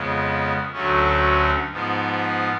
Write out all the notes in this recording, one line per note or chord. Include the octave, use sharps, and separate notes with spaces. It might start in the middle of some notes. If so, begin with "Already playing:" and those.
Already playing: F2 C#3 G#3 B3
D2 D3 F#3 A3 C#4
G#2 F3 B3